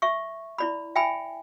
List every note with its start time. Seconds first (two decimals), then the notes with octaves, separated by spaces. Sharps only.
0.02 E5 C#6
0.58 E4 D5 B5
0.96 E5 G5 G#5 B5